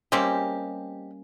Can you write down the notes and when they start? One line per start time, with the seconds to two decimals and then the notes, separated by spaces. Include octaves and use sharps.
0.12 G3 G#3 A#3 C4 C#4 G4